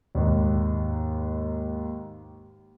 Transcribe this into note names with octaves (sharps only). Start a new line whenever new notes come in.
D#2 G#2